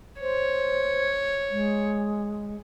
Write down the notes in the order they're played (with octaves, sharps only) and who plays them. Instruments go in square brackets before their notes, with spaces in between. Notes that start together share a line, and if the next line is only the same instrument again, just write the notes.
[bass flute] C5 [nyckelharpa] C#5
[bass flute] G#3